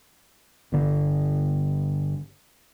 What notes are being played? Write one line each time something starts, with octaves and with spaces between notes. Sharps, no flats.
G1 D3